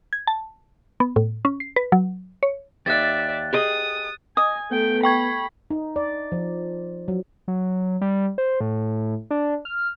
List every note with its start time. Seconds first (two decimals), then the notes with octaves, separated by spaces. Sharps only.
0.13 G#6
0.27 A5
1.00 B3
1.16 A2
1.45 C#4
1.60 C7
1.76 B4
1.92 F#3
2.43 C#5
2.86 D#2 D5 E5 F#6 A6
3.53 G4 G#4 D#5 D#6
4.37 D#5 G#5 D#6
4.71 A3 B3 G5
5.03 G5 B5 C#6 G#6
5.70 D#4
5.96 D5
6.32 F3
7.08 F#3
7.48 F#3
8.01 G3
8.38 C5
8.61 A2
9.31 D4
9.65 F6